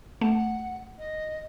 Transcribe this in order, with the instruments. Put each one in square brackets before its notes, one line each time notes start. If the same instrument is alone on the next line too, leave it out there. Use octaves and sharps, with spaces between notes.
[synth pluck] A3 [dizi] F#5
[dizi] D#5